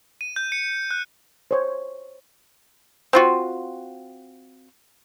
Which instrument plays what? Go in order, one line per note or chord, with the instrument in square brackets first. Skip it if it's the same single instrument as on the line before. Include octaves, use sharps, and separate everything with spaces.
[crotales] D#7
G6
C#7
F#6
[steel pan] C5 C#5
[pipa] C4 F4 F#4